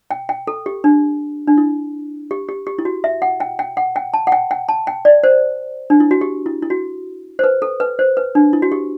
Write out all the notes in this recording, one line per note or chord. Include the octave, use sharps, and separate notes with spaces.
G5
G5
A4
G4
D4
D4
E4
G4
G4
G4
E4
F#4
E5
F#5
G5
G5
F#5
G5
A5
F#5
G5
G5
A5
G5
D5
C5
D4
E4
F#4
G4
E4
E4
F#4
C5
B4
A4
B4
C5
B4
D4
E4
F#4
G4